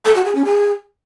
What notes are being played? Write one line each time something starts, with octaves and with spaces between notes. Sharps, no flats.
A4
F#4
G#4
C#4
G#4